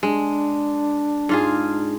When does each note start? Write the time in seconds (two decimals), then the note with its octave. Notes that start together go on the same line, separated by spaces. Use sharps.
0.03 G#3 D4
1.29 G#2 F4 G#4